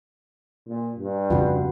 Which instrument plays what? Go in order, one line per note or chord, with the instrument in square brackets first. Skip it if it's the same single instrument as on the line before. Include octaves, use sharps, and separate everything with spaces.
[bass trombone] A#2
G2
[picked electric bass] F2 C#3 F3 [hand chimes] F4 F#4 F#5